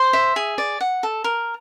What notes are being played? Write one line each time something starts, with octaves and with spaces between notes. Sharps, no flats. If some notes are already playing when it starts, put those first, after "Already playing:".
Already playing: C5
E5
G#4
D5
F#5
A4
A#4